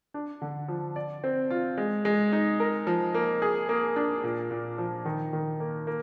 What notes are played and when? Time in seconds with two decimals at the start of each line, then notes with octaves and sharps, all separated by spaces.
0.14 D4
0.42 D3
0.68 F3
0.96 D5
1.24 C4
1.50 F4
1.77 G#3
2.05 G#3
2.33 D#4
2.60 A#4
2.87 F3
3.14 A#3
3.42 G#4
3.69 A#3
3.96 D4
4.23 A#2
4.51 A#2
4.78 F3
5.05 D#3
5.33 D#3
5.60 A#3
5.87 A#3